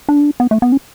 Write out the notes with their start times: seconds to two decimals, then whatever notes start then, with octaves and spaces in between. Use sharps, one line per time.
0.09 D4
0.40 B3
0.51 A3
0.62 B3
0.72 C#4